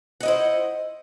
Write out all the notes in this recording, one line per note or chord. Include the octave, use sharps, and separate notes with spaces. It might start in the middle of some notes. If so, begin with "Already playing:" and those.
E4 C5 D#5 F#5